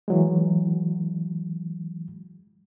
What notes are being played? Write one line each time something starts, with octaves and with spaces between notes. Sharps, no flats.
E3 F#3 G#3